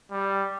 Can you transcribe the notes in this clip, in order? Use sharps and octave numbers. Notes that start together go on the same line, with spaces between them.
G3